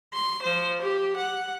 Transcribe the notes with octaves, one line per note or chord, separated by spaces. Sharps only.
C6
F3 C5
G4
F#5